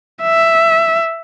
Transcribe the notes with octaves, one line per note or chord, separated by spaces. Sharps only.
E5